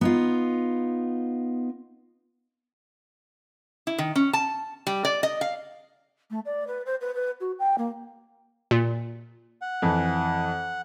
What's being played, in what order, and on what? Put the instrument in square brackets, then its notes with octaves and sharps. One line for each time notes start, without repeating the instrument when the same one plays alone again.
[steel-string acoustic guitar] B3 D#4 F4
[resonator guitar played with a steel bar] E4
D#3
C#4
A5
G3
D5
D#5
F5
[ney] A3
D5
B4
C5
B4
B4
F#4
G5
A#3
[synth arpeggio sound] A#2
[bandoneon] F#5
[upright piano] F2 E3